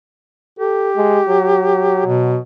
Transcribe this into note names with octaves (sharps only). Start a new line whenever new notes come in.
G4 A4
G#3
F#3
B2